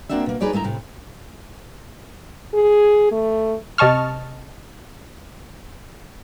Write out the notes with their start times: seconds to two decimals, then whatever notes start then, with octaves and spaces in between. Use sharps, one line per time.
0.09 A#3 C4 D4 F#4 E5
0.26 B2 A#3
0.41 D#4 G#4 B4 C#5 D5
0.52 D#2 G#3 A3 E4 A#5
0.64 A2 C3
2.54 G#4
3.11 A3
3.78 C3 D#5 A5 C#6 F6